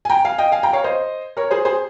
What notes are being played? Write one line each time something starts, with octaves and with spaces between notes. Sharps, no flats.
G#5
G5 A#5
F5 G#5
D#5 G5
F5 G#5
G5 A#5
C#5 F5
C5 D#5
A#4 C#5
G#4 C5
G#4 C5